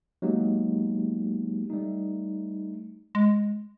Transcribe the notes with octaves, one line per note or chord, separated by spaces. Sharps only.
F#3 G#3 A#3 B3 D#4 G4
G3 A3 D#4
G#3